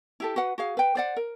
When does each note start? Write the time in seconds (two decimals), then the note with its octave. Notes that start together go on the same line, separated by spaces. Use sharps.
0.20 E4 G4 A4
0.36 F#4 B4 F#5
0.58 F#4 G#4 F5
0.77 B4 G5
0.95 C5 D5 F#5
1.17 A#4